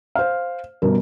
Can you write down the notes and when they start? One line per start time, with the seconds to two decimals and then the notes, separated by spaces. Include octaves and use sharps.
0.15 C5 F5
0.82 G1 B2 A#4